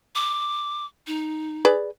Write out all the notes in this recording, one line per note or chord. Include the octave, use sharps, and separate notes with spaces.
D6
D#4
G#4 B4 D5